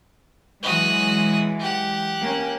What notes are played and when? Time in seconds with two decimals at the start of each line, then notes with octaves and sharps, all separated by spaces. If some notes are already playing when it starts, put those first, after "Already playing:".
0.62 E3 F#3 G#3 F#4 D#6
1.60 G4 F#5
2.21 A#3 C#4